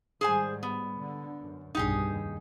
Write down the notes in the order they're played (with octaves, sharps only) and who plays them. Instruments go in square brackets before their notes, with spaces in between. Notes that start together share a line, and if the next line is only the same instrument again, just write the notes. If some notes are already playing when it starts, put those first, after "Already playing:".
[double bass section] G#2 D#3 G3 [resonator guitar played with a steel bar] G#4 C5 G#5
[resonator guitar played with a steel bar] B3
[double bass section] D3
F#2
[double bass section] F1 B1 G2 [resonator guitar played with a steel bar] D#4 G4 G#4
[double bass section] D#2